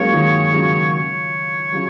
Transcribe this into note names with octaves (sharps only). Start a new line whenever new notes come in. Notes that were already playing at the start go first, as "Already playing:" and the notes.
Already playing: F#3 G#3 A#3 C#4 C#5
D#3 G#3
C#3 F#3
C#5
C#3 F#3